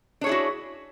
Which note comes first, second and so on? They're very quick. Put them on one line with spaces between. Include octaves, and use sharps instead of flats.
D4 C#5 G#4 E4 F#4